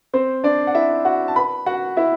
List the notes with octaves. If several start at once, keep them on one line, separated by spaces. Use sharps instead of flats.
C4 C5
D4 D5
F#5
E4 E5
F#4 F#5
A5
B4 B5
F#4 F#5
E4 E5